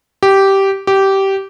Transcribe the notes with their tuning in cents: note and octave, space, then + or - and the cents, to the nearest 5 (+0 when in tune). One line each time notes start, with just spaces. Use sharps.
G4 -10
G4 -15